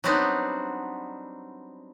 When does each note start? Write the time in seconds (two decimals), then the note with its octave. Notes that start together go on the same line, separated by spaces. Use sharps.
0.04 F#3 G3 B3 C4 D4 D#4